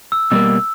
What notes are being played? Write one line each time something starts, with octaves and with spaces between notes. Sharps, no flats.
E6
B2 G3 A#3 E6